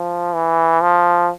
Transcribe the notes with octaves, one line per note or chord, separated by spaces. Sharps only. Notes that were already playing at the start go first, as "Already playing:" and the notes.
Already playing: F3
E3
F3